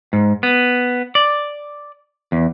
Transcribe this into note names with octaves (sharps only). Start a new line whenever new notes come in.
G#2
B3
D5
E2